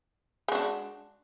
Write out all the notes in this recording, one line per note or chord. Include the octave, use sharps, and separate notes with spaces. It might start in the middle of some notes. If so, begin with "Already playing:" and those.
G#3 D4 F#4